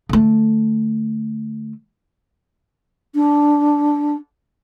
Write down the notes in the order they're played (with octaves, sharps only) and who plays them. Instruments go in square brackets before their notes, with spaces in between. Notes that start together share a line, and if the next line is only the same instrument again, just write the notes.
[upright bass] D3 A3
[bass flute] D4